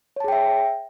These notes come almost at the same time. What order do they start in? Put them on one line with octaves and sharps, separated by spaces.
C#5 A5 G#4 G5 E5